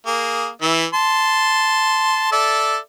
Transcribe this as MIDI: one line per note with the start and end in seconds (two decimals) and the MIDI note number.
0.07 0.48 58
0.07 0.48 68
0.62 0.85 52
0.62 0.85 76
0.94 2.28 81
0.94 2.28 84
2.32 2.77 69
2.32 2.77 74
2.32 2.77 76